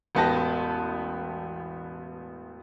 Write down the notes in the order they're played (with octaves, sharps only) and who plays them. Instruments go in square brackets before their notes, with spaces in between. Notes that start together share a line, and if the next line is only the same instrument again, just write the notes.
[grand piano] E1 A1 B3 G4 A5 A#6